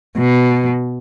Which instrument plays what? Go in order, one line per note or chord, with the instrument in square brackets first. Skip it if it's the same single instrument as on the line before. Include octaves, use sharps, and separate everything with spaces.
[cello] B2